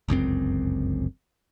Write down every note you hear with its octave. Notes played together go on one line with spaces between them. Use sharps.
G1 C#2 F#2 C4